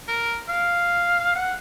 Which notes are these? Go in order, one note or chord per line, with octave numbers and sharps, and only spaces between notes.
A#4
F5
F#5